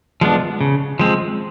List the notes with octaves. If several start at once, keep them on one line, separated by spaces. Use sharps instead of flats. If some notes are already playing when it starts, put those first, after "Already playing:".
F3 G#3 B3 D4
C#3
F3 G#3 C4